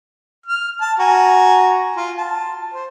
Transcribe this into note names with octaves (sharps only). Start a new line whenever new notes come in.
F6
A5
F#4 G#5 A#5
F4
A5
C5